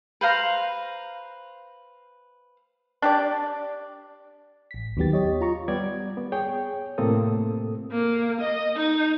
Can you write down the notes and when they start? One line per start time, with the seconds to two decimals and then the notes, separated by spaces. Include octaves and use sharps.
0.21 B4 C5 F5 A#5
3.02 D4 G4 D5
4.71 A1 B6
4.97 D#2 D#3 F#3 B3 G4 A6
5.13 G4 C#5 D#5
5.41 F4 A#5 C#6
5.68 G3 B3 D5 G#6
6.17 B3
6.32 G#4 C#5 G5
6.98 A2 C3 A#3 C4 A4 D#6
7.91 A#3
8.41 D#5
8.76 D#4